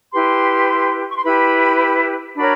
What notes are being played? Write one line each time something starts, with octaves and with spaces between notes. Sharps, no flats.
E4 G4 B4 C6
C#6
C6
E4 G4 B4 B5
D4 F#4 A#4 C#5 B5